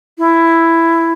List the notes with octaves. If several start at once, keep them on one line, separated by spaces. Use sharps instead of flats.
E4